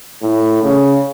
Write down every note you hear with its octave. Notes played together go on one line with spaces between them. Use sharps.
A2
C#3